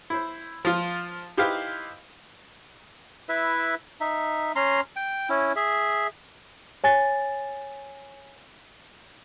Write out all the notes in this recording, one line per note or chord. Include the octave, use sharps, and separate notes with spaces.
E4 C5
F3 F4
D#4 E4 G4 B4 C5 F5
E4 B4 E5
D#4 E5
C#4 A#5 C6
G5
C#4 E4
G#4 E5
C#5 G#5 A6